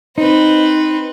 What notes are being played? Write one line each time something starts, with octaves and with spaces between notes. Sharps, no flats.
C4 D#4 B4